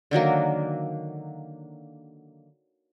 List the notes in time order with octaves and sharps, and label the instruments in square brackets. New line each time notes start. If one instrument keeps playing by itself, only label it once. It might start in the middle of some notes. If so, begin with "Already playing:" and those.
[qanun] D3 D#3 F#3 A#3